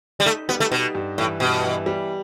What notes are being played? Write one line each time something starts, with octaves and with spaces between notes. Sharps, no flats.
G3
A3 D#4
G3 B3
A3
B2 D#4
G2
A2 E3
G2 B2
E3
G3